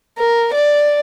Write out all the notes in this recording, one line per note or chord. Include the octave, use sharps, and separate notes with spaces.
A#4
D5